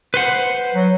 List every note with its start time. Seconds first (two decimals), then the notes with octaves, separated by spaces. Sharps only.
0.14 B4 C5 F#5
0.74 F#3